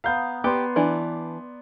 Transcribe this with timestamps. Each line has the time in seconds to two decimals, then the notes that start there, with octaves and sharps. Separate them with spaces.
0.04 B3 F5 A#5 G6
0.44 B3 G4 D5 C6
0.76 E3 D4 E4